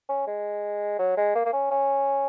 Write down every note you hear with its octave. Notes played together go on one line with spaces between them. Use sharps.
C#4
G#3
F#3
G#3
A#3
A#3
C#4
C#4